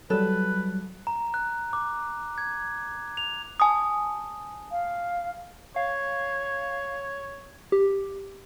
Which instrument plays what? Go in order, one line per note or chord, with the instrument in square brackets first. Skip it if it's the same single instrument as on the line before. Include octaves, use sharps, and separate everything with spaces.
[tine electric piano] F#3 G3 [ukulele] A4 [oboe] B4
[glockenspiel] A#5
F#6
D6
G#6
F7
[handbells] G#5 A5 D#6
[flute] F5
[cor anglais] C#5 [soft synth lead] F5
[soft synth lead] G4